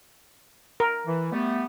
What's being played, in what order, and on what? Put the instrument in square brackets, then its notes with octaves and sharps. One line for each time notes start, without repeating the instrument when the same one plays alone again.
[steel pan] A#4
[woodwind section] E3
G3 A3 B3